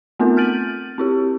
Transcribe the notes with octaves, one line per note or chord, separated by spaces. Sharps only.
A3 B3 C4 D#4 F4 A#4
F6 G6 A6 D7 D#7 F#7
C4 E4 G4